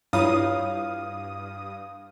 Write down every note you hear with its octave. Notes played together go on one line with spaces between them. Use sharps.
G2 E4 F4 C#5 F5 D#6